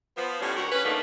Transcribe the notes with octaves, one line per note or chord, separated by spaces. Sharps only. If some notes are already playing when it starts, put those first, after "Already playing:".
F3 B3
A2 G3 C#4
D2 F#4 A#4
C#4 B4
D3 F3 A3 A#3 D4 D#4